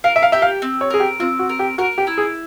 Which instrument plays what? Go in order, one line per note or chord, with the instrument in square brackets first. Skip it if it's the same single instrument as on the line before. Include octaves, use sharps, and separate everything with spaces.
[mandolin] A#4 [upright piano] F5
[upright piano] E5
F5
[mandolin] G4 [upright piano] E5
[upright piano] F5
[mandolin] C4
[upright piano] C#5
[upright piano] G#4 [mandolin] A#4
[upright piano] G4
[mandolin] C4 [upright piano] F4
[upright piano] F#4
[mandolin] A#4
[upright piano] G4
[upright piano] F#4 [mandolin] A#4
[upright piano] G4
[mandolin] E4
[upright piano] G#4